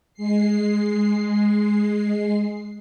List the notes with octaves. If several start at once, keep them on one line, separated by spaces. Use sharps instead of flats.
G#3 C7